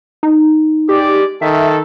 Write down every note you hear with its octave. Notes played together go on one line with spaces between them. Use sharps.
D#4
G#3 G4 D5 D6
D#3 A4 E5